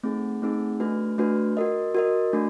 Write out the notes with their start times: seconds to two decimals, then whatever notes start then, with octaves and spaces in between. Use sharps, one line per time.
0.03 A3 C4 D#4 G#4
0.42 A3 C4 D#4 G#4
0.80 A3 D4 F#4 B4
1.18 A3 D4 F#4 B4
1.57 F#4 A#4 D#5
1.95 F#4 A#4 D#5
2.33 A3 D4 F#4